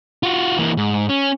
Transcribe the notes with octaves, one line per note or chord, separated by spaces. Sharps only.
F4 F#4
E3 A#3
G#2
C#4